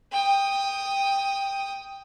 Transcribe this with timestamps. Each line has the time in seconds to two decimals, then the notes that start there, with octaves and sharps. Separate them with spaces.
0.12 G5 D#6